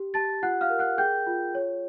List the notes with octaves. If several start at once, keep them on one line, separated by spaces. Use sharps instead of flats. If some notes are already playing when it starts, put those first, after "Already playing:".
Already playing: G4
G4 A5 A6
F4 F#5 F#6
F5 F6
A#4
F#5 F#6
G#4 G5 G6
F4
C#5